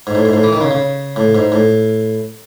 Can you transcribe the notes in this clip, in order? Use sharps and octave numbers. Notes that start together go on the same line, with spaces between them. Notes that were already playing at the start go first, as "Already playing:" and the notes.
G#2
A2
G#2
A2
E3
D#3
C#3
C#3
A2
G#2
A2